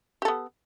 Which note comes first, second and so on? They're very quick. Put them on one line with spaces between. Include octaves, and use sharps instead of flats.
G4 A4 B3